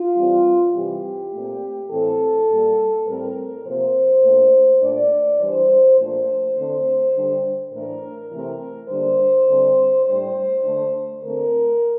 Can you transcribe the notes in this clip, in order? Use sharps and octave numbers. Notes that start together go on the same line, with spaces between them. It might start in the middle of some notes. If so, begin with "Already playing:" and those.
Already playing: F4
E3 G3 C4
C3 E3 G3 G4
A#2 A3 C4
A2 E3 A3 C4 A4
A#2 G3 A#3
A2 G3 C4 A#4
C3 F3 A#3 C5
A#2 A3 D4
A#2 A3 D4 D5
E3 G3 D4 C5
A#2 F3 A3 D4 C5
D3 A3 C4
D3 G3 D4
A2 E3 A3 D4 A#4
C3 E3 A3 C4
D3 G3 A#3 D4 C5
D3 G3 C4
A2 G3 D4 C5
D3 A3 D4
D3 A3 C4 A#4